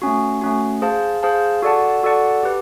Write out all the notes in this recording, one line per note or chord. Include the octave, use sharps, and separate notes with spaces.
A3 C#4 F#4
A3 C#4 F#4
G#4 C5 F5 A5
G#4 C5 F5 A5
F#4 A4 D5 F#5 A5
F#4 A4 D5 F#5 A5
G4 B4